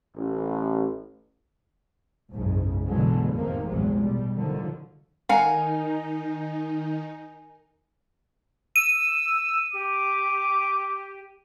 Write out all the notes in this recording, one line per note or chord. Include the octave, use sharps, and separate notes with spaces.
A1
F#1 B1 G#2 C#3
B2 D3 E3 F#3 G#3
F1 A2 C3 D#3 A#3
A#1 E2 A2 C3 F#3 G#3
B2 G3
D3 D#3 F3 F#3
D#3 D#4 A#4 F5 F#5 G#5 A#5
E6 D#7
G4 D6